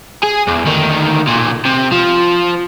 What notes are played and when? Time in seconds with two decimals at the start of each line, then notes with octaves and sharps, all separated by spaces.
0.23 G#4
0.47 E2
0.65 D2 D#3
1.27 B1 A#2
1.65 C3
1.91 F3